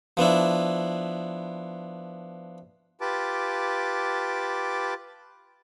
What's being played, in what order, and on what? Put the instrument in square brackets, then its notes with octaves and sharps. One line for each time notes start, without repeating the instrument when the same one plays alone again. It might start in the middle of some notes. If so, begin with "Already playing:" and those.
[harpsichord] F3 B3 D4 E4
[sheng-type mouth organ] F4 G4 B4 A5 D6